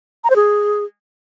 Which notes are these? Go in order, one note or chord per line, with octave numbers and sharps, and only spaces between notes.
A#5
C5
G#4